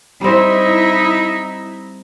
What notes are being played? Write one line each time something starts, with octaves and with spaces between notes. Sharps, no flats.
G3 C4 D#4 E4